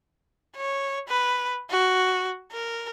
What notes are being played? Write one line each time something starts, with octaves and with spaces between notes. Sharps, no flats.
C#5
B4
F#4
A#4